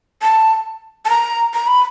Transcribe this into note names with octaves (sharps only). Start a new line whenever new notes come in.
A5
A5
A#5
A#5
B5